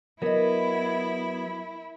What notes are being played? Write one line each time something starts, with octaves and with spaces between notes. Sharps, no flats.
F#3 B3 E4 A#4 D#5